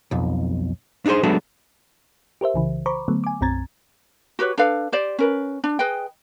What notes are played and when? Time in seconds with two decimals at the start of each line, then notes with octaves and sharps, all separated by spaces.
0.11 B1 F2
1.06 D4 D#4 F#4 G#4 C5
1.23 F#3 G#3 A3 B3 D4 F#4
2.41 G4 A#4 C5 E5
2.54 C2 C#3 E3
2.86 C5 A#5 B5 C#6 D6
3.08 D3 F#3 A3 B3
3.24 G#5 D6
3.41 B1 F#2 C4 A#5 G#6 A6
4.39 F#4 G4 B4 C#5
4.58 D4 A4 B4 F5
4.92 G4 C5 D5
5.19 C#4 A#4 B4
5.64 D4
5.79 G#4 B4 D#5 G5